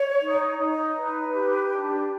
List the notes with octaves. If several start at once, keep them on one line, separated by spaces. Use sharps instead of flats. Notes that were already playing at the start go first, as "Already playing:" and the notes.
Already playing: C#5
D#4
D#4
B4
G4
D4